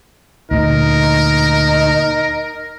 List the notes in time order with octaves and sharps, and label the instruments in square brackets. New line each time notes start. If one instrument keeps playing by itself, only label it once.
[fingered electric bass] D2 A#2 [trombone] D#4 [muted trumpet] A#4